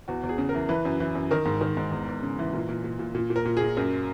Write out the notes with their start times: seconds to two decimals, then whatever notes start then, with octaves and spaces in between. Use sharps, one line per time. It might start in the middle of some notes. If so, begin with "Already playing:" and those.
0.08 E2 F#4
0.23 E2
0.29 G#4
0.38 C#3
0.49 A#4
0.55 E3
0.69 E3 B4
0.85 F#2
1.00 E3
1.15 F#2
1.31 D#3 A#4
1.46 G#2
1.61 D#3
1.77 G#2
1.92 E2
2.08 E2
2.22 C#3
2.39 E3
2.53 A#2
2.69 A#2
2.84 A#2
2.99 A#2
3.15 A#2
3.30 A#2
3.36 A#4
3.45 A#2
3.57 A#2 G#4
3.77 F#2 A#4